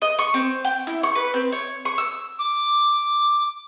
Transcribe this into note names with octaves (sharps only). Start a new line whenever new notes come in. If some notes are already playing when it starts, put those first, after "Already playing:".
D#5
C#6
C4
G5
E4
C#6
B4
C4
C#5
C#6
E6
D6